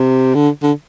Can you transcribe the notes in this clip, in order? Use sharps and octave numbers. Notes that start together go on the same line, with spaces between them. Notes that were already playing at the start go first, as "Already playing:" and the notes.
Already playing: C3
D3
D3